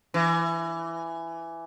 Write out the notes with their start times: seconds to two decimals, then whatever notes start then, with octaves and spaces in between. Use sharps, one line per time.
0.14 E3